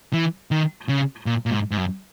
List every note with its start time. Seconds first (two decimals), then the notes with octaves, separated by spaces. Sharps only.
0.13 E3
0.51 D#3
0.89 C#3
1.26 A#2
1.46 A#2
1.51 G#2
1.71 G#2
1.77 F#2